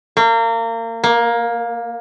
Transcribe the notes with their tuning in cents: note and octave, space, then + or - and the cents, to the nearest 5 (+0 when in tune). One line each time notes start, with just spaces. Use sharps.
A#3 -30
A#3 +15